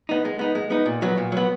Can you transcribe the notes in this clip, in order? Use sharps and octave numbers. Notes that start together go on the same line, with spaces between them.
B3 D#4
G#3
B3 D#4
G#3
B3 D#4
A#2
F#3 B3
A#2
F#3 B3